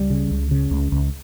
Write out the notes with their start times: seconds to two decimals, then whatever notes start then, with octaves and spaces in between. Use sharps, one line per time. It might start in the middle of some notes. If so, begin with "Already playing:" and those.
Already playing: C#2 G3
0.10 C#3
0.31 C#2
0.51 C#3
0.71 C#2
0.92 C#2